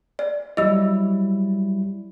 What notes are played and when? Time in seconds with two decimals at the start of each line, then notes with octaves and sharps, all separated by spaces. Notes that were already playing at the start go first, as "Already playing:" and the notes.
0.19 D5
0.57 F#3 G3 E4 D#5 E6